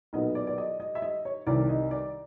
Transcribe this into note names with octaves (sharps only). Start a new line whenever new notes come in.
B1 A#2 F#3 B3 D#5
D5
D5
D#5
D#5
E5
D#5
C#5
C2 C3 D#3 D5
D#5
D5